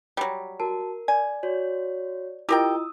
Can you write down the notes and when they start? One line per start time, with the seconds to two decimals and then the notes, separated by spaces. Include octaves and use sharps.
0.17 F#3 G3
0.60 F#4 A#4 A5
1.08 D5 G#5
1.43 F#4 C#5 D5
2.49 E4 F4 G4 A#4 D#5 G5 D#6 E6